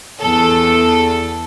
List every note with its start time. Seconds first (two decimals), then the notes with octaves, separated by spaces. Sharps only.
0.19 E2 A4